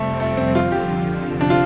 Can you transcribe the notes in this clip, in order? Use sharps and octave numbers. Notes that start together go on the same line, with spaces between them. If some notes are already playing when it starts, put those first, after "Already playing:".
Already playing: F2 C3 G3 A3 C4
A3
C4
F2 D3 F3 F4
G4
C3 F3 C4 F4
D4
F4